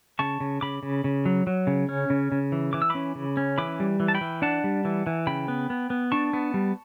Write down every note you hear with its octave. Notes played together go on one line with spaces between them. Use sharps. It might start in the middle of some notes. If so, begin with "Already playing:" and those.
C#3 A5 C#6
C#3
C#3 B5 D6
C#3
C#3
F#3
F#3
C#3
C#4
C#3
C#3
E3
E3 D6
E6
C#4 B5 D6
C#3
C#4
E3 B5 D6
G3
E3
A5
G5 B5
E3
D4 F#5 A5
G3
E3
E3
C#3 G5 B5
B3
B3
B3
D4 A5 C#6
B3
G3